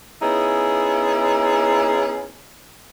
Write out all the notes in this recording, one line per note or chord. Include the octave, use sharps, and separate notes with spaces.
B3 C#4 D#4 E4 G#4